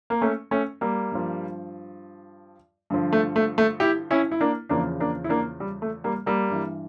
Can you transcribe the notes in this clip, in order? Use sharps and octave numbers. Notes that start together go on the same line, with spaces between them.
A#3
A3 C#4
A3 C#4
G3 A#3
G2 F3
G2 D3 F3
A3
A3
A3
E4 G4
C#4 E4
E4
A#3 D4
E2 C#3 F3 A#3 D4
A#3 D4
E4
A#3 D4
G3
A3
G3 A#3
G3 A#3
G2 E3